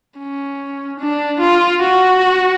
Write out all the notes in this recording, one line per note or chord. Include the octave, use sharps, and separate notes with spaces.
C#4
D4
F4
F#4